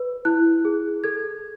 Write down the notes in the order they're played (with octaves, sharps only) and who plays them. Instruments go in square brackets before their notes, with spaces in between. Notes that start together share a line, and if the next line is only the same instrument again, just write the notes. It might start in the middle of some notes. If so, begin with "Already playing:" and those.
Already playing: [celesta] B4
E4 F#6
G#4
A4 G#6